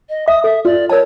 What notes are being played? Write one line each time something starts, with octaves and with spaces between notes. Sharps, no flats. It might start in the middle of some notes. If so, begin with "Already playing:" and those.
D#5
E5 D#6
A4 E5
F4 D5
A#4 C#5 A5